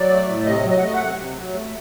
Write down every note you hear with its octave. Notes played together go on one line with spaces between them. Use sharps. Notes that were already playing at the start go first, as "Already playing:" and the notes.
Already playing: F#3 D5
A3
A2
C3 D#5
F#3
D#5
F#5
A3 D#5
F#5
C3
C3
F#3
A3